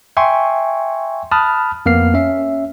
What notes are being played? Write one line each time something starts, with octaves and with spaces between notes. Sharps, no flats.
E5 G5 G#5 C6 C#6
A5 B5 D#6 F6 F#6
F2 A#3 B3 F6 C7
C#4 E5